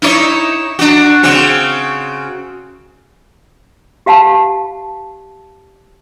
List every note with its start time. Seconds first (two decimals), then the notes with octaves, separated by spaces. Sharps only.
0.02 D#4 E4 C#5
0.79 D4 F#4
1.23 C#3 C4 F#4
4.06 G4 F5 F#5 A5